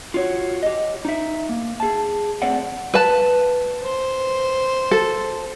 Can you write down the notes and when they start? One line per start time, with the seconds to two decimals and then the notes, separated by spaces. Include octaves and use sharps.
0.14 F4 F#4 C#5
0.63 G4 D#5
1.05 D#4 E5
1.49 A#3
1.80 G#4 A5
2.42 A3 C4 C5 D5 F#5
2.94 B4 A5
3.83 C5
4.91 A4